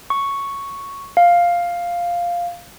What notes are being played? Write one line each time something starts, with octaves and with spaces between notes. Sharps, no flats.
C#6
F5